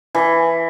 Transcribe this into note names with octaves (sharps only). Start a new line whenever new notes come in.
E3